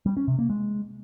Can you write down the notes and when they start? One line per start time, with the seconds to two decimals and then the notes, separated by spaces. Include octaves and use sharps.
0.06 G3
0.17 C#4
0.28 C3
0.39 A#3
0.50 G#3